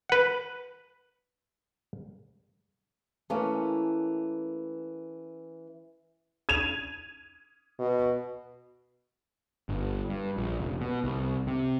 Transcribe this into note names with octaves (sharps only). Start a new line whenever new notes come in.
B4 F#5
E3 A3 A#3 C#4
G#6 D#7 F7
B2
G1
G2
A#1
F1
B2
C2
C3